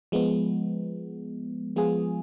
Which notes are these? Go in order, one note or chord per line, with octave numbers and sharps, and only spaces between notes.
F3 G#3 B3
F3 G#3 B3 F4 G#4